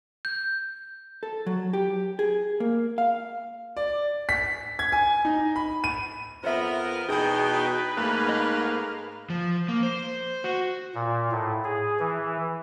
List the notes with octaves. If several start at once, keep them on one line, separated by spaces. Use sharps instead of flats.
G6
A4
F#3
G4
G#4
A#3
F5
D5
B6
G#6
G#5
D#4
B5
D#7
F2 B3 A#4 C5 E5
E2 B2 D#4 G#4 B4 G5
G#2 A3 A#3 F5
A3 D#5
F3
A#3
C5
F#4
A#2
A2
G#4
E3